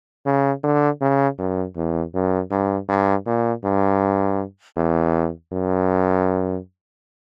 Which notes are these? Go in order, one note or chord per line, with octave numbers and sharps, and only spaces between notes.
C#3
D3
C#3
F#2
E2
F#2
G2
G2
A#2
G2
E2
F#2